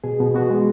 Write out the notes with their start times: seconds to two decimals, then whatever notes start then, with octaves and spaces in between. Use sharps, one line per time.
0.04 B2 G#4
0.20 B2
0.34 B3 F#4
0.51 G#3